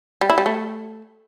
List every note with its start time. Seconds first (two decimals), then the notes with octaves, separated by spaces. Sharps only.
0.21 G3
0.30 E4
0.38 G3
0.46 A3